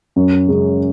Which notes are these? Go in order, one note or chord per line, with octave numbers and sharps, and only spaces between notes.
F#2
C#3 G#3 C#4